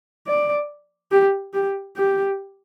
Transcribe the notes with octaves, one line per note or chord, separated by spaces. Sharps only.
D5
G4
G4
G4